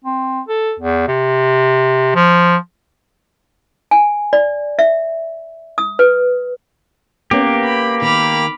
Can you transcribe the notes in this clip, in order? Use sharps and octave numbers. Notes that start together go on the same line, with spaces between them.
C4
A4
E2
C3
F3
G#5
D5
E5
D#6
B4
A#3 B3 C#4 G4
B5
D#3 B5 D6 F6